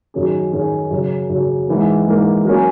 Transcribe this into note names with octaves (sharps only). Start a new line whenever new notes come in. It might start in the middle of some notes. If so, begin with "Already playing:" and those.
F#2 D#3 F#3 C#4 G#4
F#2 D#3 F#3 C#4 G#4
F#2 C#3 F#3
F#2 C#3 F#3
G#2 E3 A#3
G#2 E3 A#3
F#3 A#3 C#4